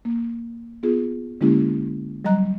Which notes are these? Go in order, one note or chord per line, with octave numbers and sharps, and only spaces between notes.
A#3
B3 F4 G#4
D3 G#3 A#3 C#4 E4 G4
F#3 G3 D#5 A#5 F#6